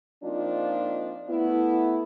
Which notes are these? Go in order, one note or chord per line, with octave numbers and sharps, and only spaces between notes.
F3 A#3 C4 D4 D#4 F4
A3 B3 E4